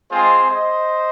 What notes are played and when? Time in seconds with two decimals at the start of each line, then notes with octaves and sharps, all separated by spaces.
0.11 G#3 C4 F4 G#4 C5
0.50 C5 D#5